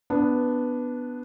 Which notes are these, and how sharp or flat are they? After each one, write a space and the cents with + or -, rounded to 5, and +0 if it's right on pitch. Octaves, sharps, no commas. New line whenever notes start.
B3 +0 D4 +0